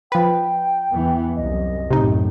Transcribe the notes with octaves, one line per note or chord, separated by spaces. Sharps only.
F3 B4 G5
E2 E3 B3
C2 F#2 D#5
F#2 A2 C3 D#4